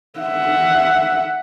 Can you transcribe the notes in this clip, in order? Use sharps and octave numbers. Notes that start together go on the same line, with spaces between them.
E5 F#5